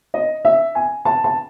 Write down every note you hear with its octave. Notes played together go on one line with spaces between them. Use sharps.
D#5
E5
G#5
A5
A5